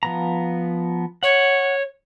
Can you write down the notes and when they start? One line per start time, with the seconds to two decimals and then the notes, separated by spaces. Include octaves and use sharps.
0.03 F3 B3 A#5
1.23 C#5 F#5